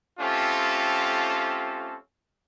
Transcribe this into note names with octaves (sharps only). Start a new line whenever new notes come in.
A3 C4 C#4 F4 G4 A4